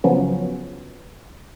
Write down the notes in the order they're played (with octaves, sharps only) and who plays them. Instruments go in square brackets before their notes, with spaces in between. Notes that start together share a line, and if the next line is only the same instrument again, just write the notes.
[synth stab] C#3 F3 F#3 B3 C#4